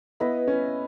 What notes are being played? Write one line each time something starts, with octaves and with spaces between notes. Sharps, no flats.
B3 E4 B4 D#5
C#4